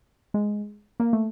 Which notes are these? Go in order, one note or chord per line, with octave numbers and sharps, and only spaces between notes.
G#3
A#3
A3